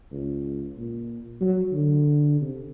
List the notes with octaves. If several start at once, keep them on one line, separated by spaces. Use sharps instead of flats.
C#2
A#2
F#3
D3
C3